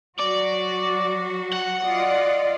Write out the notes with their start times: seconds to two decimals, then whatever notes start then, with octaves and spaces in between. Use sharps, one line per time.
0.19 F#3 F#4 D5
1.53 F#5
1.84 F4 D5 D#5